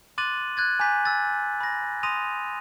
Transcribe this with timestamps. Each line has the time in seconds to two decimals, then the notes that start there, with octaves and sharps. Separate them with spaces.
0.18 C6 D6 F#6 A6 D#7 F#7
0.57 F#6 G#6 A6
0.80 G#5 A#5 D6 G6 B6
1.05 E6 A6
1.61 B5 A#6
2.03 C6 D#6 A#6 D#7 F7